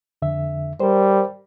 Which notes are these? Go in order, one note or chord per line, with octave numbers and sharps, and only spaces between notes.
F2 D3 E5
G3 A#4 C5